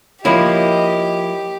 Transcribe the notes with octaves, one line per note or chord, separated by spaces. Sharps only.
F3 A#3 E4 G4 C#5 D#5 B5